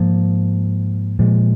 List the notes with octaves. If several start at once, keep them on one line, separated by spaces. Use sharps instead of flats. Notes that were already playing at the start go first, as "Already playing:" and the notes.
Already playing: G#2 F3 A#3
A#2 F3 G#3